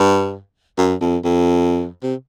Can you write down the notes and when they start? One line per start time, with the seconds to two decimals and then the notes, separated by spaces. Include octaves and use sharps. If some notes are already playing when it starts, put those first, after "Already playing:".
Already playing: G2
0.78 F#2
1.01 F2
1.24 F2
2.03 C3